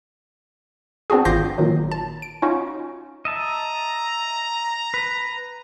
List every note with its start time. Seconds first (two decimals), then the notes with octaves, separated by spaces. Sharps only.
1.10 B3 C4 D4 F#4 G#4
1.25 G#1 F4 D6 G6 A#6 C7
1.58 A#2 D#3 F#3
1.91 A5
2.22 D7
2.42 C#4 D#4 F4 F#4
3.25 D#5 E5 A5 A#5
4.94 B4